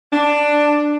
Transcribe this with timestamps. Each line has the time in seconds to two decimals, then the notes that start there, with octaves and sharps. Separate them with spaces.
0.13 D4